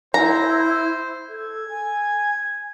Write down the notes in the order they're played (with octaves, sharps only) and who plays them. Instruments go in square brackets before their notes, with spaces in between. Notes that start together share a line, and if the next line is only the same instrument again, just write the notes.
[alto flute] E4 [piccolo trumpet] C5 [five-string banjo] A#5
[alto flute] A4 [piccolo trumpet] G#6
[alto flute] G#5